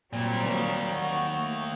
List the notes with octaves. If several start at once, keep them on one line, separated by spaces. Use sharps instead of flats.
A#2 F#3 G3 C4
D#3 A#3
F#4
A3